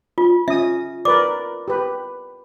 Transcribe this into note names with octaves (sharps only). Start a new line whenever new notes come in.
F4
C#4 E5 D#6
A#4 B4 D5 D6
G4 B4